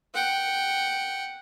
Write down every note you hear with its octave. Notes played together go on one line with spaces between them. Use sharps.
F#5 G5